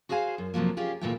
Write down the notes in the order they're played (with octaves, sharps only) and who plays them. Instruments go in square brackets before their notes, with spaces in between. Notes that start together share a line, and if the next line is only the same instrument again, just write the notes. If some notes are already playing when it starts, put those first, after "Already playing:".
[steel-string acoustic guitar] F#4 G#4 C5 F5 G#5
F#2
F2 C3 F3 F#3 A#3
C#4 F4 G4 G#4
D2 A#2 E3 A3 E4 G5